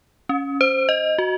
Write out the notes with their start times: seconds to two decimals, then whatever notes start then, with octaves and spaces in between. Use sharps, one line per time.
0.29 C#4
0.61 C5
0.89 D#5
1.18 F#4